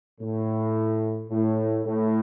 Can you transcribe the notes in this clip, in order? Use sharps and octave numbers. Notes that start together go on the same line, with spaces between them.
A2
A2
A2